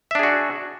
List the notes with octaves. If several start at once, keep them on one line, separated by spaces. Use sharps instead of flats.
D4 F#4 G#4 E5